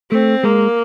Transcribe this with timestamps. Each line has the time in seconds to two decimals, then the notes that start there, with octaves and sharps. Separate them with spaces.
0.12 A3 C4
0.43 G#3 A#3